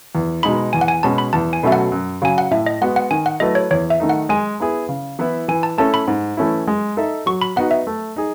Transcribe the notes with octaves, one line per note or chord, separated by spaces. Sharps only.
E2
B2 G#3 D#4 B5
E2 G#5
F#5
G#5
B2 G#3 C#4 F#4 A5
B5
E2 A5
G#5
B2 F#3 A3 C#4 E5
F#5
F#2
C#3 F#3 G#5
F#5
A2 E5
D#5
G#3 B3 F#4 F#5
F#5
D#3 G#5
F#5
F#3 A3 E4 B4 D#5
C#5
E2 C#5
E5
D#3 A3 D#4
F#5
G#3 G#5
B3 E4 G#4
C#3
E3 B3 E4
E3 G#5
A5
A3 C#4 E4 A4 A5
B5
G#2
E3 A3 C#4 E4
G#3
D#4 A4 E5
F#3 C#6
B5
B3 D#4 F#4 F#5
E5
A3
D#4 G#4